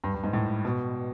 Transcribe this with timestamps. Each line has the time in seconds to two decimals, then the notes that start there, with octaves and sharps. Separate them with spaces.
0.04 G2
0.14 G2
0.24 G#2
0.33 A2
0.65 B2